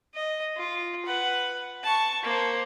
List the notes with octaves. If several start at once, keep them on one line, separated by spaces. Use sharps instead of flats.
D#5
F4
B4 F#5
A5 C#6
A#3 C5